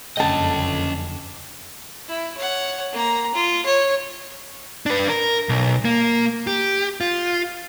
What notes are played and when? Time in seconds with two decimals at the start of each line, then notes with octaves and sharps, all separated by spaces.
0.17 F#1 F2 D3 C#4 D#5 G5 A5
2.08 E4
2.37 C#5 F#5
2.92 A#3 A#5
3.35 F4
3.66 C#5
4.86 D4 B4
5.09 A#4
5.49 B1
5.85 A#3
6.47 G4
7.01 F4